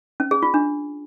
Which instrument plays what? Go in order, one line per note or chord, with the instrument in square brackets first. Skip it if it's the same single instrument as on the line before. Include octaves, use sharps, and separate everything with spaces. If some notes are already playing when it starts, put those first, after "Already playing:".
[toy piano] C#4
G#4
F4
D4